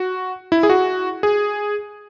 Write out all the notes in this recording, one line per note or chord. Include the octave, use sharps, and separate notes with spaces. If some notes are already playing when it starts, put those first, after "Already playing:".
Already playing: F#4
E4
G#4
F#4
G#4